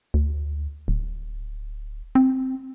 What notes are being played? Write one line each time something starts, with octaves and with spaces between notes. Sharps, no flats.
D2
D1
C4